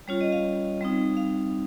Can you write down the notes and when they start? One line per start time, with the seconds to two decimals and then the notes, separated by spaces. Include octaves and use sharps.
0.08 G3 C#4 F4 C#5
0.21 D#5
0.32 F5
0.81 G3 C4 D#4
1.17 F5